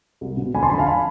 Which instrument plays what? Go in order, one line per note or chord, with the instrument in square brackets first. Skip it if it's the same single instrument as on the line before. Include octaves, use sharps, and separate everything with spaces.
[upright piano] C2
B2
D2 G#5 B5
A5 C6
D3 F3 G#5 B5
F5 A5
G#5 B5